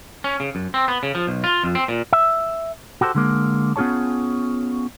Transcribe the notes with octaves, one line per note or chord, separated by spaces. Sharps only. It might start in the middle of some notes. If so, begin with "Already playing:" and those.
C#4
C#3
F#2
C4
B3
C#3
F3
B1
F4
F2
C4
A#2
E5
F#4 G4 A4 B4 C5
D3 G#3 A#3
B3 C#4 F4 G#4 C#5 A5